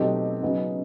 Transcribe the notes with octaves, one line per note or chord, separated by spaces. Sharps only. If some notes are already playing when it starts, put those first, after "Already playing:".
Already playing: B2 F#3 A3 C4 D#4 G4
C#3 F#3 B3 D#4